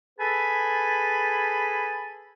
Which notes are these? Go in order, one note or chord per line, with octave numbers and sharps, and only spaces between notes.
G#4 A4 B4 G#5 A5 B5